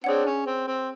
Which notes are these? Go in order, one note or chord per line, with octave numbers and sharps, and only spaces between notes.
C4 D4 G#4 C#5 F#5
C#4
C4
C4